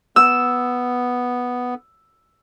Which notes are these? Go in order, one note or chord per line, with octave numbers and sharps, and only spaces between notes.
B3 E6